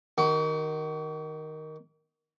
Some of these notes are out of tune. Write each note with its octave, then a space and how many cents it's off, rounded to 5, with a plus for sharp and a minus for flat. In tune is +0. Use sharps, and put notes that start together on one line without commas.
D#3 +0 F#4 +40